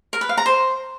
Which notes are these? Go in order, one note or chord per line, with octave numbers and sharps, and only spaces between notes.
A#4
B4
F5
A#5
C5